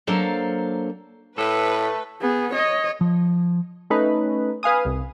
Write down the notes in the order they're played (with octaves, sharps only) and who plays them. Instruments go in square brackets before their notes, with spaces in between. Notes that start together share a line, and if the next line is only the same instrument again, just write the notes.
[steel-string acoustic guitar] F#3 A#3 D4 A4 C5 F5
[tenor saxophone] A2 [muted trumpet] A3 [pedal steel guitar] A4 [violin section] B4
[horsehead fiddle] B3 G#4
C#5 D#5
[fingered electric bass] F3
[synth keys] A3 C#4 D#4 B4
B4 F5 G#5 D#6
C2